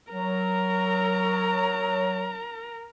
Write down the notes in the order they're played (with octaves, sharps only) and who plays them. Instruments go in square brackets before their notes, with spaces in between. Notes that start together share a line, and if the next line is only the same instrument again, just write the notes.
[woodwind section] F#3 [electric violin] A#4 A#5